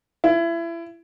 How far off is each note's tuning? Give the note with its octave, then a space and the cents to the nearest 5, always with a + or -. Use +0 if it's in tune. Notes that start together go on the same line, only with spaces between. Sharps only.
E4 +30